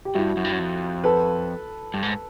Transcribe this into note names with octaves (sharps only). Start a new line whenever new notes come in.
G4
G2 E4 F#4
F#2
G2
F#2
F2
A4 B4
G2
G#2